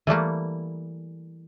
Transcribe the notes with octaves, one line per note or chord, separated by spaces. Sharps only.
E3 G3 A3 A#3